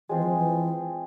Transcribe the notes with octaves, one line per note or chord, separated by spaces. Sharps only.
E3 G#3 C4 F4 G#4
F3
E3